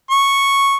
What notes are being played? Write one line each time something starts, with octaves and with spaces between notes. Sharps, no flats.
C#6